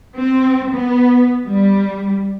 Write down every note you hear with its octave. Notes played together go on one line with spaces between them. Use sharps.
C4
B3
G3